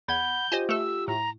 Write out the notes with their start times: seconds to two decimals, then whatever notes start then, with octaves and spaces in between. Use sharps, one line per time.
0.08 E2 F#5 B5 G6 G#6
0.52 F4 G4 C5 D#5 G#5
0.69 A3 A4 E6
1.08 A2 A#5